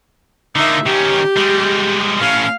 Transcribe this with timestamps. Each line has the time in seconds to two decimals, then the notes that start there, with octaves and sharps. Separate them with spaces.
0.56 D3 A#3 D#4 E5
0.86 D#3 C#4 G4
1.36 G3 G#3
2.21 A2 C#4 F5